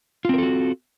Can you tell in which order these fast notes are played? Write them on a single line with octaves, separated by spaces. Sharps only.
F4 C4 A#4 A4 F#4